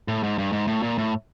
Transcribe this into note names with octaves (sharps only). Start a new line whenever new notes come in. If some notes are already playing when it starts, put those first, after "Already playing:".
A2
G#2
G2
G#2
A2
A#2
A2